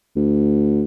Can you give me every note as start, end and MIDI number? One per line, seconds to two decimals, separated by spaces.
0.16 0.85 38